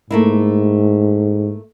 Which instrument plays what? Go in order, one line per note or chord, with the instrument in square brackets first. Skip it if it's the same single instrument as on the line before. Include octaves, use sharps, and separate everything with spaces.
[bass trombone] G#2 [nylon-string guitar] A3 A#3 E4